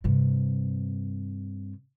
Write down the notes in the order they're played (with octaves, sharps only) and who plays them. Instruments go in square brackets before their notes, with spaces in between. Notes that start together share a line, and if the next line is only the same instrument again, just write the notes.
[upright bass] G2 C3